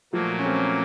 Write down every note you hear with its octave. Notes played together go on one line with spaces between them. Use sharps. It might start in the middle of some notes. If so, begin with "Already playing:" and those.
A#2 F3 F#3 A3 A#3
C#4
A3 C4